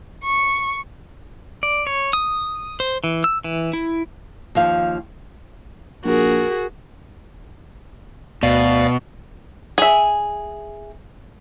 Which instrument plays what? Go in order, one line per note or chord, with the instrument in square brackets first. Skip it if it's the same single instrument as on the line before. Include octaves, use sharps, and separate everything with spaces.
[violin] C#6
[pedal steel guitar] D5
C#5
D#6
C5
E3
E6
E3
E4
[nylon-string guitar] D#2 F3 F5
[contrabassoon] A#1 [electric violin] F#4 G#4 [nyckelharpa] A#4
[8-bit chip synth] D2 D5 F5 [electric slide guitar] B2
[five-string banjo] G#4 E5